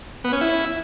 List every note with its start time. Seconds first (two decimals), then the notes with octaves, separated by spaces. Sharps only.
0.24 B3
0.33 C#4
0.41 E4